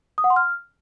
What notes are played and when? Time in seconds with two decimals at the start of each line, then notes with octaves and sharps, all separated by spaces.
0.18 D#6
0.24 F#5
0.30 C6
0.36 F6